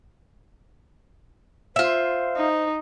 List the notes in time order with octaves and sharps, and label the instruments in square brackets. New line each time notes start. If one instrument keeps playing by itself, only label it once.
[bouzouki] F4 E5 [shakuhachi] C5
[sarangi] D#4